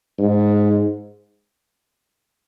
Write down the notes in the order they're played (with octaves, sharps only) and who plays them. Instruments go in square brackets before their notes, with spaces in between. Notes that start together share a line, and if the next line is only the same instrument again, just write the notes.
[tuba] G#2